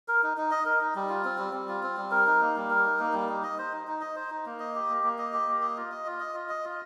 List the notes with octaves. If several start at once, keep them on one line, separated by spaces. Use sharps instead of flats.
A#4
D#4
D#4
D#5
A#4
D#4
G3
F4
C4
G3
G3
F4
C4
G3
A#4
D#4
A#3
G3
A#4
D#4
A#3
G3
D#4
D#5
C5
D#4
D#4
D#5
C5
D#4
A#3
D#5
G4
A#3
A#3
D#5
G4
A#3
D#5
F4
D#5
F4
D#5
F4
D#5
F4